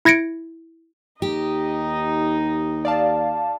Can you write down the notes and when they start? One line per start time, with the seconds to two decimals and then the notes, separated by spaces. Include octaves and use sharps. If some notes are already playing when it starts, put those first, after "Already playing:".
0.05 E4 G#6 A#6 C#7 D7
1.22 D#2 D#4 G4 D#5
2.85 D5 F5 A5